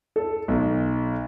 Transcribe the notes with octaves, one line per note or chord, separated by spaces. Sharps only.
A4
B1